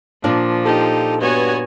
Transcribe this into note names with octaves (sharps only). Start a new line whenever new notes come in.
A#2 F3 D4 F4
D#4 G4 A4
G2 B3 F#4 C#5 G#5